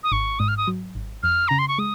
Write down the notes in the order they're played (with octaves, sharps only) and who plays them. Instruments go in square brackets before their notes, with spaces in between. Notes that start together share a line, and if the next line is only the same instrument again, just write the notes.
[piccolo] D#6
[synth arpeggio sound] G#1 [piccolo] C#6
[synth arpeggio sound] G#2 [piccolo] D#6
[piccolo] F6
D#6
[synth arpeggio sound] F#3
G#1
[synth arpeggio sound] F2 [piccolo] F6
[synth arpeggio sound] C#3 [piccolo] A#5
[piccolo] C6
C#6
[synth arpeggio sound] G#3 [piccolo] D#6